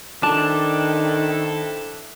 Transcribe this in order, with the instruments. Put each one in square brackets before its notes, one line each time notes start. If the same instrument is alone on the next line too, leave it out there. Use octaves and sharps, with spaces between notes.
[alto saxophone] D#3 [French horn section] C4 E4 A4 [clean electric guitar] D4 [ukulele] A5